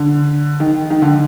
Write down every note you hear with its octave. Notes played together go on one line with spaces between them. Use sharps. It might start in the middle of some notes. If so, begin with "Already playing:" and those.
Already playing: D3
D#3
D#3
D3